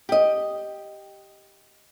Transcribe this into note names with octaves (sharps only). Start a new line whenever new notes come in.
G4 D#5